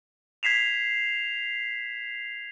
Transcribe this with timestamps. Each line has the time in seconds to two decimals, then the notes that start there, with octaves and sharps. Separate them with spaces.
0.43 G#6 B6 C7 E7 F7